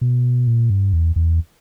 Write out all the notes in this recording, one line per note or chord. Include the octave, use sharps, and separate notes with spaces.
B2
A#2
G2
E2
E2